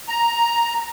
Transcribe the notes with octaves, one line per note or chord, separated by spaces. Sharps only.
A#5